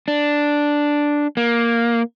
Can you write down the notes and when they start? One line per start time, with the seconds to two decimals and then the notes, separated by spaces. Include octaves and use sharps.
0.08 D4
1.37 A#3